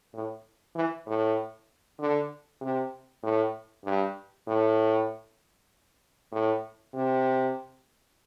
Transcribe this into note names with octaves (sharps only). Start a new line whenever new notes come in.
A2
E3
A2
D3
C3
A2
G2
A2
A2
C3